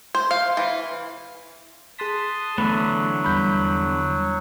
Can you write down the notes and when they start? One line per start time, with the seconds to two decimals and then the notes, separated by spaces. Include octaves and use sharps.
0.15 C5
0.31 F5
0.57 E3
1.99 G#4 A5 C6 D#6 F#6 B6
2.58 D3 E3 F#3 A3 B3 B5
3.24 E2 G3 B5 G6